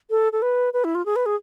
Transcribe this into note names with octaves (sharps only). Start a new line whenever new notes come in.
A4
A4
B4
B4
E4
F4
G#4
B4
G#4